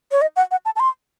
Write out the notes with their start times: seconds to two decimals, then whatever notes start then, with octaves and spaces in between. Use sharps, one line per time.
0.12 C#5
0.21 D#5
0.36 F#5
0.51 F#5
0.65 A5
0.76 A5
0.80 C6